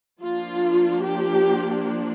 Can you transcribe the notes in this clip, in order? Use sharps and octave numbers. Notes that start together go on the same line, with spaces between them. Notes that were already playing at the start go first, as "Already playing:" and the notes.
F3 A#3 D4 F4
G4